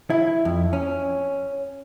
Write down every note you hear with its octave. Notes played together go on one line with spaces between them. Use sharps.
E4
F2
C#4